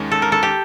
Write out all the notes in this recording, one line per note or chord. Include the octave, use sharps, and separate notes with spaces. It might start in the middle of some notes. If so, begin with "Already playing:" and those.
Already playing: D#2 D#3 G#3 C#4
A4
A#4
A4
G4